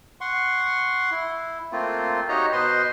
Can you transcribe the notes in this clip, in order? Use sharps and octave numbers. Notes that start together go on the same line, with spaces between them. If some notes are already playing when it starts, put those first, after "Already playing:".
F#5 C6 C#6
E4
A3 A#3 C4 F4
D#4 F#4 G4 C#5 D#5 A#5
B2 B4 C5 D#5 C6